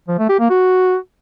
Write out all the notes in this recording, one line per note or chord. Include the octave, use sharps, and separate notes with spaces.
F3
A3
G4
A#3
F#4